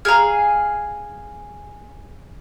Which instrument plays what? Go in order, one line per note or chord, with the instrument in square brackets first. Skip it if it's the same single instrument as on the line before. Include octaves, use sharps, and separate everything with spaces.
[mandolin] G#4 F5 [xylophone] A#5 F6